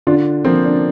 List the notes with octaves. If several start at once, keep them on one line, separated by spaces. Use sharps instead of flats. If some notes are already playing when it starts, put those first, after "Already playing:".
D3 D4 F4
F3 A#3 C4
D4